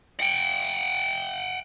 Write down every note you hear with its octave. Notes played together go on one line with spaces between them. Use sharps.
F#5 G5